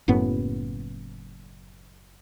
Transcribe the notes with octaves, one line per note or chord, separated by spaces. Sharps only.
F#1 F#2 A2 B3